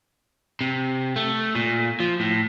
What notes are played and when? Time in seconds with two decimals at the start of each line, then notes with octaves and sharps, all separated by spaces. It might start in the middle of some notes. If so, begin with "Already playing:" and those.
0.61 C3
1.16 A3
1.55 A#2
2.00 F3
2.20 A2